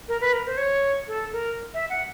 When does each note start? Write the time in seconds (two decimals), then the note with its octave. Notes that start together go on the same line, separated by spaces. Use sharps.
0.08 A#4
0.21 B4
0.33 A#4
0.46 C5
0.57 C#5
1.08 A4
1.33 A#4
1.74 E5
1.90 F#5